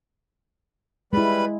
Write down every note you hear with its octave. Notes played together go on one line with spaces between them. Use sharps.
G3 G#3 E4 B4 B5